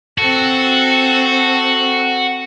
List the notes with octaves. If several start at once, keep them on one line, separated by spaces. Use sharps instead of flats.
C4 F#4 A4